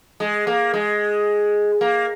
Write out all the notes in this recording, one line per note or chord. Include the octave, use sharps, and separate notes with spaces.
G#3
A#3
G#3
A#3